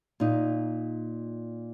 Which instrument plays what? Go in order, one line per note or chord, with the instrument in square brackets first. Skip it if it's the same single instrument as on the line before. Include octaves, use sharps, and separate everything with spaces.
[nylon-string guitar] A#2 D#4